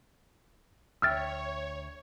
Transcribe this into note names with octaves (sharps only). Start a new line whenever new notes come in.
D2 C#5 E5 G5 E6 F6 A6